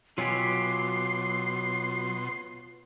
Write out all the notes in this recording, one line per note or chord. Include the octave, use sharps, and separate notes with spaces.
B2 F#3 F4 G4 C#5 G#5 C6 C7